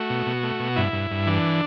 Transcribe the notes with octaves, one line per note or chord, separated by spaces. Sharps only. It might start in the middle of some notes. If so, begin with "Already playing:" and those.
Already playing: A3 F#4
B2
B2
A3
B2
G2 E4
G2
G2
E3 D4